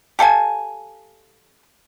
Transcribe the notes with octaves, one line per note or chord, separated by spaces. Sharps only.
G4 A4 F5 G#5